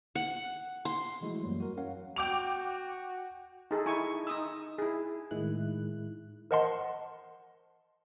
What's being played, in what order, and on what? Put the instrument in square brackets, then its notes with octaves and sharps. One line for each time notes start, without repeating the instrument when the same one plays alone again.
[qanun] F#5
C6
[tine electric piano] E3 F3 G#3 A3 E4 F#4
F#2 E3 F#3 G3 A#3
F#4 A#4
C#4 A#4 C#5 F5 F#5
[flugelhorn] F#4 [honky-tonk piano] G5 D6 F7
[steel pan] D#4 G#4 A4
D#4 E4 G#5 C#6
D#4 D#6 E6
E4 G#4
[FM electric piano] A2 D#3 G#3 E4 F#6
[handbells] A#4 C5 D#5 F#5 A5 C6